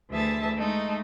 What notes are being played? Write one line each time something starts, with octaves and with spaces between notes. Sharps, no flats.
D2 E3 G#4 E5 A5 A6
G#3 A3 D#4